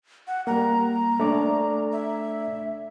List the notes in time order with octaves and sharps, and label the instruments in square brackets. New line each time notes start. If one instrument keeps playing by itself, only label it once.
[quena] F#5
[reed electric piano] G3 A#3 [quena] A#5
[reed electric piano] A3 D4 D5
[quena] E5